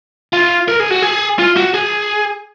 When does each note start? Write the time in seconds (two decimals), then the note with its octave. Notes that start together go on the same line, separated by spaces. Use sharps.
0.33 F4
0.68 A#4
0.80 G#4
0.91 F#4
1.02 G#4
1.39 F4
1.57 F#4
1.74 G#4